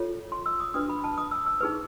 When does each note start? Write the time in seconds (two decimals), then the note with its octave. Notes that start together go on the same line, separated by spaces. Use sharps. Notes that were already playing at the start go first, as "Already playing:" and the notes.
Already playing: F4 A4 C#5
0.32 C6
0.46 E6
0.60 D#6
0.74 D4 F#4 B4 D#6
0.89 B5
1.04 A5
1.18 D#6
1.31 E6
1.46 E6
1.60 D#4 G#4 B4